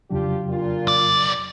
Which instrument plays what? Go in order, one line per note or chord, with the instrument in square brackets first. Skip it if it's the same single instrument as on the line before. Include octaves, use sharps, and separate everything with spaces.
[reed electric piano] F2 C#3 F#3 [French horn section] D4 F4 G4
[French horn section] A#2 D4 F4
[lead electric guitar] B1 D5